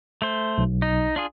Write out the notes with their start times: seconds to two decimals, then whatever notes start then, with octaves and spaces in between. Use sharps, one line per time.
0.22 A3 C5
0.58 B1
0.82 D#4
1.16 D4 F4 G#4